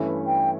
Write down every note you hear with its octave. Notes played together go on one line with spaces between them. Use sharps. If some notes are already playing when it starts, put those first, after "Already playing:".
Already playing: G2 E3 A3 C#4 E4
G5